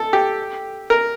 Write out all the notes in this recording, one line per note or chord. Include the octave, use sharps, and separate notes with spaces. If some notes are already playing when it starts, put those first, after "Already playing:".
Already playing: A4
G4
A#4